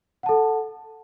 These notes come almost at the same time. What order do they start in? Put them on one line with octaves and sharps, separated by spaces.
F#5 A5 A4